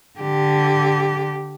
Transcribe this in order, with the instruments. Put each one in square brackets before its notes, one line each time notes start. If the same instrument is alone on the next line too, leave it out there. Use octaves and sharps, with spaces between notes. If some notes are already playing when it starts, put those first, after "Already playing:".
[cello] D3 G4